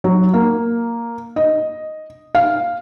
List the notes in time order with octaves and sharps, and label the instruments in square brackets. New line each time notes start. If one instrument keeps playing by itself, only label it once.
[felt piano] F#3
A#3
D#5
F5